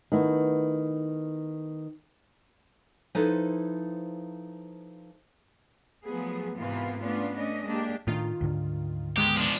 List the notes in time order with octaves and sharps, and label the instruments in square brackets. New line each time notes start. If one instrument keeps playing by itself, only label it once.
[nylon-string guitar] D#3 A3 B3 E4
F3 D#4 E4 A4 B4 C5
[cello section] F3 F#3 A3 B3 G#4
G#2 C3 E3 A#3 B3 F4
A3 B3 C#4 D4 F4
A3 C#4 D4 D#5
G#3 A#3 D4 G4
[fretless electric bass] A2 A3 D4 [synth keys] D#3 F4
[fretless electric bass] D2 G#2 D3
[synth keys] D#3 G#3 B3 [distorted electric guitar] G4
[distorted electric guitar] F3 D4